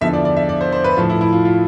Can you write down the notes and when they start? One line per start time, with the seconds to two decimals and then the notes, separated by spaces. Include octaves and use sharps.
0.01 E2 D3 F3 E5
0.13 D5
0.25 D5
0.37 E5
0.49 D5
0.61 C5
0.72 C5
0.84 B4
0.97 A2 F3 F4
1.10 E4
1.21 E4
1.33 F4
1.45 F4